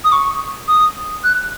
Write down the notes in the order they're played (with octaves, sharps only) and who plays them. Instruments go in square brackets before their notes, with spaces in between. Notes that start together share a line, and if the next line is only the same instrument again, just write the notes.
[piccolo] D#6
C#6
D#6
F#6